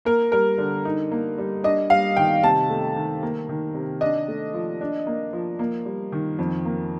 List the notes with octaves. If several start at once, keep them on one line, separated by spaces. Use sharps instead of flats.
A#3 A#4
G3 A#4
D3
D#4
A#3
G3
D4 D#5
G3 F5
D#3 G5
C3 A5
A3
D#3
A#3
D#3
C3
D4 D#5
A3
F3
D4
A#3
F3
A#3
G3
D#3
F2
A#3